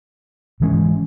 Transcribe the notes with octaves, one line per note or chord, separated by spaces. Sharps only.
G#2 E3 G#3 C#4